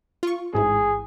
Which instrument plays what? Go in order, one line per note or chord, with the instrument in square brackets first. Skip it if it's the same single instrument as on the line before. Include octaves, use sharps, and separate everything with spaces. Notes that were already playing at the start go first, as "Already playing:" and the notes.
[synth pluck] F4 C#6
[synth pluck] A1 G#2 E4 [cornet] G#4